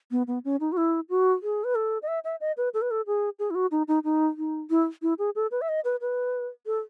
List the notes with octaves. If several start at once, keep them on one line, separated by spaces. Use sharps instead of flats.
B3
B3
C#4
D#4
F#4
E4
F#4
G#4
B4
A4
D#5
E5
E5
D#5
B4
A4
B4
A4
G#4
G#4
E4
F#4
D#4
D#4
D#4
D#4
E4
E4
G#4
A4
B4
E5
D#5
B4
B4
A4